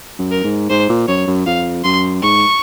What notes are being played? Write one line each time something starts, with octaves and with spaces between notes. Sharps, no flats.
F#2
A#4
G#2
G#2 C5
A#2
F#2 C#5
F#2
F2 F5
F#2 C6
G#2 C#6